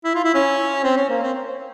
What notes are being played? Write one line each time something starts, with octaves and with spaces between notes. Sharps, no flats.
E4
F4
E4
C#4
C4
C#4
A#3
C4